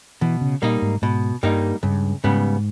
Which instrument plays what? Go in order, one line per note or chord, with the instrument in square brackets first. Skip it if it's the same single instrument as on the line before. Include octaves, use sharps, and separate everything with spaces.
[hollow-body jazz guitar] B2 [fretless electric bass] E3
[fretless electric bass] C#3
[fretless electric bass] A#2 [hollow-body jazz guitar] G3 A#3 D#4
[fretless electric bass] G#2
[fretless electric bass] G#2 [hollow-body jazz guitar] B2
[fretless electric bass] G2 [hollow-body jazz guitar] G3 A#3 D#4
[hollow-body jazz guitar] C#2 [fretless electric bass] G2
[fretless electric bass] G#2 [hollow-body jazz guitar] C#3 G3 B3